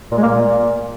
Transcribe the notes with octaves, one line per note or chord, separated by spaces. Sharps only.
A#2
G#3
A#3
A#2